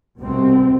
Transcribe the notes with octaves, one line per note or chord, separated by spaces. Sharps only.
C2 B2 G3 C4